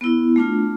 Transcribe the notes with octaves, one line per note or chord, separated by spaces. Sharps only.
B3 E4
A3 D4 F4